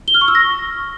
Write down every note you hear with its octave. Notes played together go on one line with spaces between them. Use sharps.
G7
F6
C#6
E6
A#6